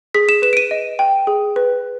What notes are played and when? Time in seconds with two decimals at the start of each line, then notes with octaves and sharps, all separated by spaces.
0.14 G#4 B6
0.29 E7
0.42 B4 E7
0.53 D7
0.57 D#7
0.71 D#5
0.99 G5
1.27 G#4
1.56 B4